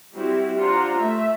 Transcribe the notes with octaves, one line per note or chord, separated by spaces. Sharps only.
G3 C4 E4 F#4 G4
D4 F4 C5 F#5 A#5
A3 E5